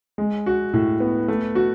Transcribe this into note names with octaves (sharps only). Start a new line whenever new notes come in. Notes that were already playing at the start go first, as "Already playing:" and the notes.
G#3
F#4
A2
B3
A3
F#4